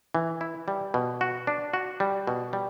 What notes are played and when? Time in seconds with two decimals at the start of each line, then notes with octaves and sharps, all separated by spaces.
0.15 E3
0.41 E4
0.68 G3
0.94 B2
1.21 F#4
1.47 D4
1.73 F#4
2.00 G3
2.27 B2
2.53 G3